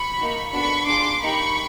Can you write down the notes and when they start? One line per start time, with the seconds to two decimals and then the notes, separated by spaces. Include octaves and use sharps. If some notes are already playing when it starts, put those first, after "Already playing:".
Already playing: B5 C#6
0.18 A#3 D#4 F#4
0.52 B3 D4 F#4 A4 B5 C#6
0.86 D4 F4 G#4 C6 D6
1.22 A#3 D#4 G4 B5 C#6